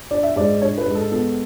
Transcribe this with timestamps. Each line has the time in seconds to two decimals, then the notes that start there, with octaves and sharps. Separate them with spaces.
0.11 D4 D5
0.23 E5
0.36 G#2 D5
0.62 D4 C#5
0.78 B4
0.86 G#2
0.95 A4
1.11 B3 A4